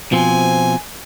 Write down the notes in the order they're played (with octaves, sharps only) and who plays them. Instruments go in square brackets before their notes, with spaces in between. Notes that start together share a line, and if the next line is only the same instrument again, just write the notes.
[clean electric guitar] B2 F3 C4 [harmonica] G#5